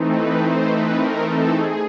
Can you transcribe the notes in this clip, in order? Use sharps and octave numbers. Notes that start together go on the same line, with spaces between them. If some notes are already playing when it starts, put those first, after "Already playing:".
Already playing: E3 A3 C4 D#4
B4
C5
B4
A#4
A4
G#4